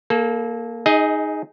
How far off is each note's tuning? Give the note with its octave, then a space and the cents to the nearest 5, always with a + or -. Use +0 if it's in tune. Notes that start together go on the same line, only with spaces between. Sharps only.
A#3 +0 A4 -30
D#4 +0 G#4 +0 D#5 +30